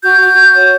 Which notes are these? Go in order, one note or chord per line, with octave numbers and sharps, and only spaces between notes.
F#4 G6
F#4
F#4
C#5